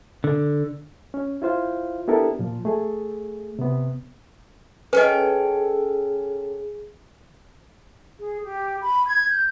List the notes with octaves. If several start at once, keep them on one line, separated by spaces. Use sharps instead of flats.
D3
C#4
E4 F4 C5 F5
B3 D4 E4 G4 A4 A#4
A#2 F3
A3 G#4
C3 B3
C#4 G#4 A4 B4 D#5 G5
G#4
G4
B5
G#6
G6